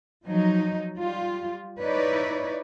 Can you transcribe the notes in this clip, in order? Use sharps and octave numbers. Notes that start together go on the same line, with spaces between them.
F3 F#3 D#4
G3 F4
D#4 E4 B4 C#5 D5